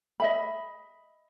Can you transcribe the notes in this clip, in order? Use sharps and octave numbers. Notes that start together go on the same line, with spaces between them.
D#5 E5 B5